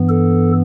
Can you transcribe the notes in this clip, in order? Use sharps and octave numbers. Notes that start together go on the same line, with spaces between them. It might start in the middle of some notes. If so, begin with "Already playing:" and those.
Already playing: G2 E3 B3
A4